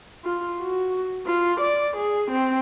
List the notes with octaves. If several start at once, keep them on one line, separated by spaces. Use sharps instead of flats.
F4
F#4
F4
D5
G#4
C4